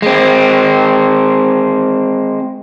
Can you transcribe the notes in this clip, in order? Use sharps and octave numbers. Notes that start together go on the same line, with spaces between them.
G#3 C4